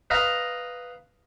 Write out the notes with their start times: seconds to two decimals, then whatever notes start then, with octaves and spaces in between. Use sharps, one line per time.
0.10 B4 D#5 F5 A#5